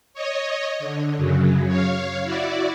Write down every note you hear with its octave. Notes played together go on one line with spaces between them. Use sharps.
C#5 D#5
D3
F#2 C#3 F#3
C#5 F5
E4 F#4 D5